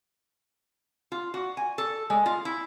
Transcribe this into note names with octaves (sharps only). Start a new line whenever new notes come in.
F4
F#4
G#5
A4
G#3
F4
E4